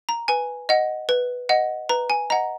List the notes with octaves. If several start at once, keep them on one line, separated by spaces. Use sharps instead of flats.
A#5
B4 G#5
D#5 F#5
B4
D#5 F#5
B4 A#5
G#5
D#5 F#5 A#5